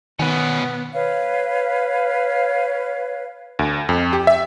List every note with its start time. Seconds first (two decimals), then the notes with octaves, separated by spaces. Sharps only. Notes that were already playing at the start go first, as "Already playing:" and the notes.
0.19 B2 D#3 B3 C#4
0.94 B4 C#5 F5
3.59 D2
3.89 F2
4.13 G4
4.27 E5